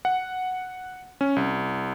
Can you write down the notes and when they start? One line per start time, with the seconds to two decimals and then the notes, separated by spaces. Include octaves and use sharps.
0.05 F#5
1.21 C#4
1.36 C2